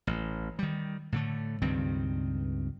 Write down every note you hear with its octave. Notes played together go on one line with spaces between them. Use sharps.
A1
D#3 G3
A2 D3 A3
C#2 G2 D#3 C4